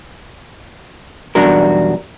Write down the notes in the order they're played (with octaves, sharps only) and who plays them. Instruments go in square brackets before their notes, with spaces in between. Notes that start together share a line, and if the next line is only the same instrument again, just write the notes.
[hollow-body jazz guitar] B1 E2 G3 D4 F#4 A#4